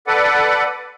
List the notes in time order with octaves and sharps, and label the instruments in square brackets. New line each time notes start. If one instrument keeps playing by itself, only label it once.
[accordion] A4 B4 D5 F#5